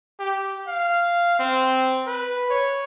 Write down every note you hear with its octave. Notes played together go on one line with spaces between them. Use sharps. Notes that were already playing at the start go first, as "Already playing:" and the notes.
G4
F5
C4
B4
C#5